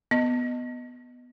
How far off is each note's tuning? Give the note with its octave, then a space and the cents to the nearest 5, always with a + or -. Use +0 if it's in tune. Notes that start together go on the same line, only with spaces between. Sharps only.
B3 +0 D#5 +0